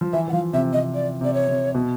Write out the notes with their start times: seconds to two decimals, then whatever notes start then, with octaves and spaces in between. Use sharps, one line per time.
0.01 F3
0.13 E3 E5
0.28 E3 F#5
0.33 F3 F5
0.53 C3 E5
0.73 C3 D#5
0.94 D5
1.21 C3 D5
1.34 C#5
1.48 C3
1.75 B2